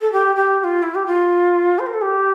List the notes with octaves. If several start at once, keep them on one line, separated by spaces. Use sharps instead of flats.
A4
G4
G4
G4
F4
E4
G4
F4
C5
A#4
A4
G4